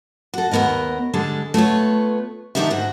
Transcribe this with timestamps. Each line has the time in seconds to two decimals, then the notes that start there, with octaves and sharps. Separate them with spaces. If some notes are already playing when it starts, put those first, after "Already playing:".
0.34 F#4 A4
0.51 D#2 G#2 B3 A#4 D#5
1.14 D3 G3 G#3 A4
1.54 A3 B3 F4 C#5
2.55 D3 D#3 G3 D#4 G4 E5
2.70 G#2 F#4